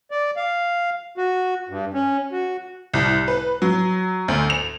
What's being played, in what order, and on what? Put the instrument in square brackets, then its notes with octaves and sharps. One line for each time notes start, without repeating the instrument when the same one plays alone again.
[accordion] D5
F5
F#4
G2
C#4
F#4
[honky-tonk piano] C2
B4
F#3
D2
F7